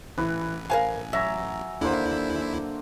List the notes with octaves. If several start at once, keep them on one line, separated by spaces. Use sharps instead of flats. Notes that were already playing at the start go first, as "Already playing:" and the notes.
A1 E3 B4
A#4 C#5 F5 G#5
F#3 E5 A#5 D6
D#2 D3 A#3 E4 C5